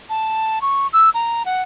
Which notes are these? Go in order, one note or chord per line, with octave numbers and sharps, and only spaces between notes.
A5
C#6
E6
A#5
F#5